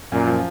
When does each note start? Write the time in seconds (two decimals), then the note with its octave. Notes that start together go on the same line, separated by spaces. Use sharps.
0.12 F#2 A#2
0.27 F3